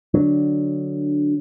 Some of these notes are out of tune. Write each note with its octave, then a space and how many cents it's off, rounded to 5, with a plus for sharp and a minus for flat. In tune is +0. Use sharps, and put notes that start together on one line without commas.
D3 +5 F#3 -5 D4 +0